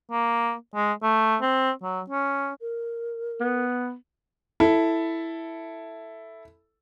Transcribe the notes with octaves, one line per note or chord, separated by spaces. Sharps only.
A#3
G#3
A3
C4
F#3
C#4
A#4
B3
E4 A4